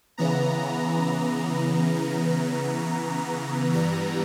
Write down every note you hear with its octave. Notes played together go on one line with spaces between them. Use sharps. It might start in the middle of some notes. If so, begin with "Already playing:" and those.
C#3 E3 B3 A#5
A#5
G2 E3 G3 B3 A#5